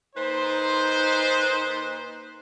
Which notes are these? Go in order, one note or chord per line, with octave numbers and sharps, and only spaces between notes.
A#2 D#4 B4 C5